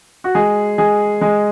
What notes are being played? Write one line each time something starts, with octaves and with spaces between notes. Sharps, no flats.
F#4
G#3 G#4
G#3 G#4
G#3 G#4